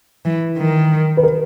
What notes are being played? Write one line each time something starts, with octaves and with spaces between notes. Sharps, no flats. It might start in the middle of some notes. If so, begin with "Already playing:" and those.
E3
D#3
B4
A#4